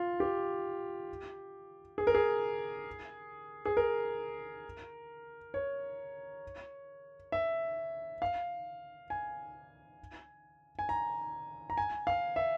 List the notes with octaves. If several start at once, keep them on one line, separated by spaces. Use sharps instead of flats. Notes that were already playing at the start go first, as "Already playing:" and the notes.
Already playing: F4
G4
G#4
A#4
G#4
G#4
A#4
C#5
E5
F5
G#5
G#5
A#5
A#5
G#5
F5
E5